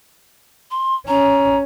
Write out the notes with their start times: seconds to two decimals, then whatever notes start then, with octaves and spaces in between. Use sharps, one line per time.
0.71 C6
1.08 C#4 A#5